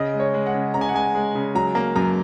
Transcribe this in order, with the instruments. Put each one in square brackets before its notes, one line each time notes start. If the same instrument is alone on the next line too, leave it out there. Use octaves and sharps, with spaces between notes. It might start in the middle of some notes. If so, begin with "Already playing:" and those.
Already playing: [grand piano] C#3 D#5
G#3
C#5
G#3
F#5
C#3
C#3 A#5
G#5
F#5
G#3 G#5
G#3
C#3
F#3 A#5
A#3
F#2 A#5